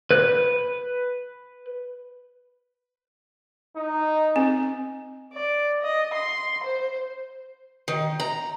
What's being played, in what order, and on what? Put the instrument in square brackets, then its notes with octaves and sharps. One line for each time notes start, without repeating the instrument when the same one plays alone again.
[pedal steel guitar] B4 F#6
[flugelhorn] D#4
[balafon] C4
[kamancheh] D5
D#5
C6
C5
[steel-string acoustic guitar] D#3
A#5